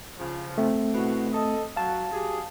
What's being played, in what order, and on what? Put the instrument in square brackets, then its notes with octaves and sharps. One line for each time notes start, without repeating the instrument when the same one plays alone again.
[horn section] C#3 F3
[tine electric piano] A3 C4
[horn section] B2 E4 F#4
A4 D#5
[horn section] F#3 [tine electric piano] F5 A5
[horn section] F#3 G4 G#4